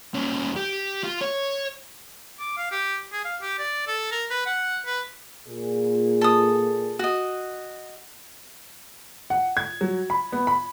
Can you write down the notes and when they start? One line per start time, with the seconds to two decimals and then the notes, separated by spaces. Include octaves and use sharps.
0.14 D#2 C#4
0.56 G4
1.03 F4
1.21 C#5
2.39 D6
2.57 F5
2.71 G4
3.13 G#4
3.24 F5
3.42 G4
3.59 D5
3.87 A4
4.12 A#4
4.30 B4
4.46 F#5
4.86 B4
5.48 A#2 G#4
6.21 A4 D#6
6.99 F#4 D#5
9.30 F#5
9.57 G#6
9.81 F#3
10.10 B5
10.32 B3
10.47 B5